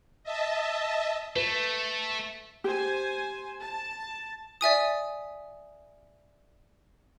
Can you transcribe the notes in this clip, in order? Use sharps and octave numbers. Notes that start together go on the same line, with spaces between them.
D#5 E5 A5
A3 B4
G4 C5 G#5
A5
D5 E5 G#5 D#6